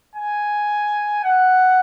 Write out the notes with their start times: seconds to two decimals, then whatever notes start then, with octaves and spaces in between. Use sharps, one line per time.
0.16 G#5
1.24 F#5